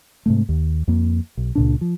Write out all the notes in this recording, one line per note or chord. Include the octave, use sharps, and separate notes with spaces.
G#2 C3 A3
D#2
F2 A#3
B1
C#2 A#2 D4
F3